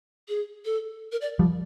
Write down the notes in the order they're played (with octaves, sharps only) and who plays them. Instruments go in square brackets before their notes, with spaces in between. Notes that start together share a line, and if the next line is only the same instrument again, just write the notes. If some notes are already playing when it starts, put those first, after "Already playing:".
[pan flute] G#4
A4
A#4
D5
[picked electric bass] F3 G3